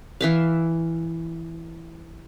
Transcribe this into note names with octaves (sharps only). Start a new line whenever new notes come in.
E3 E5 F5